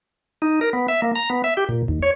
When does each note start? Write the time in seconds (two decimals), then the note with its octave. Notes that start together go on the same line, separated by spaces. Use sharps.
0.42 D#4
0.61 A#4
0.73 B3
0.88 E5
1.02 A#3
1.16 A#5
1.30 B3
1.44 E5
1.57 G4
1.69 A#2
1.88 D#2
2.03 C#5